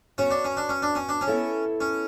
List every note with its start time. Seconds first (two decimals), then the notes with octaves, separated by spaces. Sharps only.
0.18 B3 C#4 F#4 C#5
0.31 D4
0.45 C#4
0.57 D4
0.69 C#4
0.82 D4
0.95 C#4
1.09 D4
1.21 C#4
1.27 B3 E4 A4 C#5
1.81 C#4